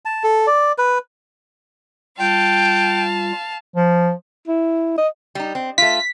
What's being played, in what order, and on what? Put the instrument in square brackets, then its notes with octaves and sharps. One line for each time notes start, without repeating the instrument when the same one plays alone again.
[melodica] A5
A4
D5
B4
[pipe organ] G3 F4 [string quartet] F5 A5 [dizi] G5
[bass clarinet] F3
[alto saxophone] E4
D#5
[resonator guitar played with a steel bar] G3 D#4
C4
[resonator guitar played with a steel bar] A3 F4 [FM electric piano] B6